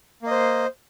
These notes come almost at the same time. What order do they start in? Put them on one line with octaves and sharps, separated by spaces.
A#3 D#5 C5